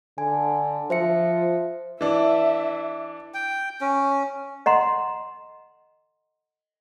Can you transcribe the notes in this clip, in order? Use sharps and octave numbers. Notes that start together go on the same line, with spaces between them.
D3 G#5
F3 C5 E5 C#7
E3 D4 E5
G5
C#4
D#5 F#5 A#5 C6